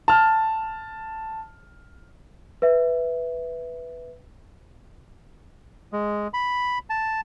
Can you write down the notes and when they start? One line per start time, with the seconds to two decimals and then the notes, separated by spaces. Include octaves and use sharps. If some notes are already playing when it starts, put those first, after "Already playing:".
0.08 A5 F6
2.62 B4 E5
5.93 G#3
6.34 B5
6.90 A5